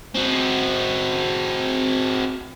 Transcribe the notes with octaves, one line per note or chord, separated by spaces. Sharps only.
C4 F#4